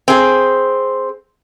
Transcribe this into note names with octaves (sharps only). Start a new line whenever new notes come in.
C4 G#4